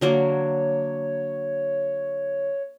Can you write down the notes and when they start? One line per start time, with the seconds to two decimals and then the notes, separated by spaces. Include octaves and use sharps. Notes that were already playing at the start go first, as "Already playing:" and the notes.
0.01 D3 F#3 A#3 C#5